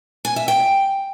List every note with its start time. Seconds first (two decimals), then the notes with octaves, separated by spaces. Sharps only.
0.25 G#5
0.36 E5
0.48 G5